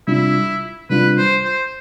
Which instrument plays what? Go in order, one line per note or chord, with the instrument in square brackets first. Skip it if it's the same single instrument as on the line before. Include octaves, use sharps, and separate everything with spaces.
[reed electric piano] C3 G3 D4 F4 [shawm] E4
[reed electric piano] C3 G3 D4 F4 [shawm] B4
[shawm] C5
C5